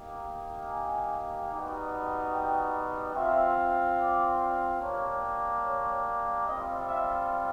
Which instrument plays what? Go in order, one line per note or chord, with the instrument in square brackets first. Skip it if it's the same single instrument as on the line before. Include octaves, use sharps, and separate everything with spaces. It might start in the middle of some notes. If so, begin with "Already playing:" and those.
Already playing: [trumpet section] A#3 D#4 G4
G#5
G3 B3 D#4 F#4
G5
C4 F4 E5
D5
A#3 D4 G4 C#5
C#5
G3 C4 F4 D#5
E5